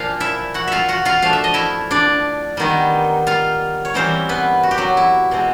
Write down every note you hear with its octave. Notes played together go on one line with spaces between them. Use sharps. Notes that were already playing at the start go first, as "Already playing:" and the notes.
Already playing: A#2 F3 A#3 D4 F4 F5
E4 E5
F#4 F#5
F4 E5 F5
F#4 F#5
F4 F5
F3 A3 D4 F5
E5
D#5
E4 E5
D4 D5
D#3 G3 B3 D#4
F4 F5
C#5
E3 G3 A#3 C4 C#4 C5
B3 B4
F#4
G4
F#3 F#4
E4
B2 G#3 C4